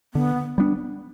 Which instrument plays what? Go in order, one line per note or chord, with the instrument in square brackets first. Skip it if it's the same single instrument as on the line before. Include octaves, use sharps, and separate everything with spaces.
[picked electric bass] D3 [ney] B3
[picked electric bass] G3 B3 D4